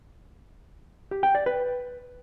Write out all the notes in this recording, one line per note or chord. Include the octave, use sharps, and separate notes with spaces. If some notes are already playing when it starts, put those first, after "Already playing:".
G4
G5
D5
B4